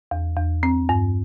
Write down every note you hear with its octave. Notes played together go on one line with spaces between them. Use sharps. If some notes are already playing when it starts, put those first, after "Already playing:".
E2
E2
C4
G2